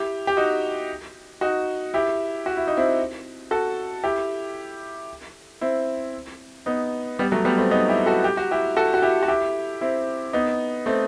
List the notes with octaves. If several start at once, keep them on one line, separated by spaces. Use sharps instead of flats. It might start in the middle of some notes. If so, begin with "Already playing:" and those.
Already playing: E4 G4
G4
D#4 F#4
D#4 F#4
E4 G4
F#4
E4
D#4
C4 E4
F#4 A4
E4 G4
C4 E4
B3 D#4
G3 B3
F#3 A3
G3 B3
A3 C4
B3 D#4
E4 G4
F#4 A4
G4
F#4
E4 G4
F#4 A4
F#4
E4 G4
F#4
E4 G4
C4 E4
B3 D#4
A3 C4